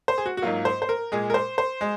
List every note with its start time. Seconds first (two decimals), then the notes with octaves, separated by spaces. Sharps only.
0.08 C5
0.18 G#4
0.26 F#4
0.37 F#4
0.42 G#2 F#3 A#3 F4
0.65 C5
0.82 C5
0.89 A#4
1.12 A#2 G#3 G#4
1.30 A#4
1.34 C5
1.58 C5
1.81 G#3